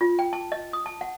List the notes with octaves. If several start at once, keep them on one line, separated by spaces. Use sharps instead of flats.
F4
G5
A5
D#5
D#6
A5
F#5